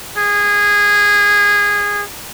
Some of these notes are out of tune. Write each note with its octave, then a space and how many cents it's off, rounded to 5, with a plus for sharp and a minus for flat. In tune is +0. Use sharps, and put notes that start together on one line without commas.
G#4 -20